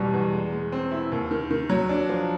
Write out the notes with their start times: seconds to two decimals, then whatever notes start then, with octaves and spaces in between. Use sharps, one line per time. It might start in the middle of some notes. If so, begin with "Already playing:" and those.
Already playing: E2 B2 F#3 G3
0.14 E2
0.33 G#3
0.52 G#3
0.72 C4
0.92 E4
1.12 D#2
1.31 D#3
1.51 D#3
1.70 F#3
1.89 D4
2.09 F3